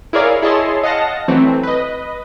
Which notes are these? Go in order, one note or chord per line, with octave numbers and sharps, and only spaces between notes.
E4 G#4 A#4 C#5 D5 F5
E4 G#4 C#5 D#5 A5 C6
D#5 F5 F#5 A5 A#6
E3 F#3 A3 C4
B4 D#5